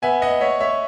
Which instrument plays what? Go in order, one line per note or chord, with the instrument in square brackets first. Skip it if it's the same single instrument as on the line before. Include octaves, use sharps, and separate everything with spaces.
[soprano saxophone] B3 [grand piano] E5 G#5
[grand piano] D#5 F#5
C#5 E5
C#5 E5